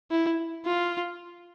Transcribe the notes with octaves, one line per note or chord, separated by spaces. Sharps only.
E4
F4